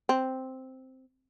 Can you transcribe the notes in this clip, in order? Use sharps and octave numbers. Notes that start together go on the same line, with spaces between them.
C4